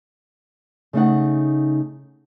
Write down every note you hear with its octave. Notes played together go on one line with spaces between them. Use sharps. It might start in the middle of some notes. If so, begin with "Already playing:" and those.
C#3 A3 D#4 F#5